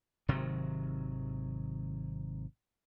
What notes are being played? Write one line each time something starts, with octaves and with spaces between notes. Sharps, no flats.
G#1 C3 D#3 F#3